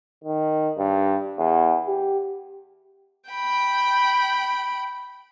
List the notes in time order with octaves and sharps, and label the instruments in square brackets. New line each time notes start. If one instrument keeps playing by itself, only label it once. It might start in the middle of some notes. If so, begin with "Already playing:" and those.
[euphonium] D#3
G2
E2
G4
[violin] G5 B5